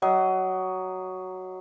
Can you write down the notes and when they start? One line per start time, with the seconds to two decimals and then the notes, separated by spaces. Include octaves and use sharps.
0.02 F#3 D#5